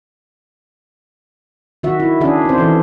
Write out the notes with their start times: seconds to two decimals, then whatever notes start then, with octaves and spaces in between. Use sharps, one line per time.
1.83 D#3 F#4 E5
2.00 E4
2.21 D#3 C#4 D4 G#4 E5
2.45 C4 C5
2.58 E3 A4